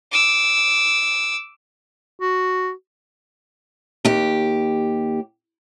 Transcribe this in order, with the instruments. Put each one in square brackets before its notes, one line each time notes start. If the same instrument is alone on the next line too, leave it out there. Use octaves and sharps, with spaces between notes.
[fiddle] D6 E6
[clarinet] F#4
[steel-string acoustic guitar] D#2 G4